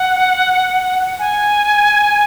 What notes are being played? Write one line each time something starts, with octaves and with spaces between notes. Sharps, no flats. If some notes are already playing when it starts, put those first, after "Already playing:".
Already playing: F#5
G#5